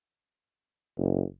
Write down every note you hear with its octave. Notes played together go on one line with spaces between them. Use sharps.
F#1